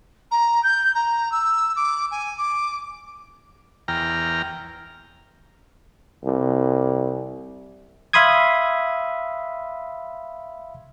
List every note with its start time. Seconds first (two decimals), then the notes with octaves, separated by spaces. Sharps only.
0.31 A#5
0.63 G6
0.95 A#5
1.32 E6
1.76 D6
2.11 G#5
2.38 D6
3.88 E2 G5 A#5 F6
6.24 C2
8.13 E5 F5 B5 C6 D#6 G#6